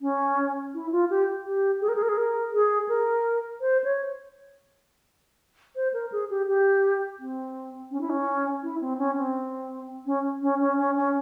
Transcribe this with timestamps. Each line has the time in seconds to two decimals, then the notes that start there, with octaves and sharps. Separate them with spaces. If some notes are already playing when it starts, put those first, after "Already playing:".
0.01 C#4
0.74 E4
0.92 F4
1.10 G4
1.46 G4
1.81 G#4
1.88 A#4
1.96 G#4
2.02 A#4
2.09 G#4
2.17 A#4
2.54 G#4
2.88 A#4
3.61 C5
3.84 C#5
5.76 C5
5.93 A#4
6.12 G#4
6.30 G4
6.48 G4
7.20 C4
7.91 C#4
8.01 E4
8.09 C#4
8.63 E4
8.81 C4
8.98 C#4
9.17 C4
10.06 C#4
10.42 C#4
10.60 C#4
10.78 C#4
10.97 C#4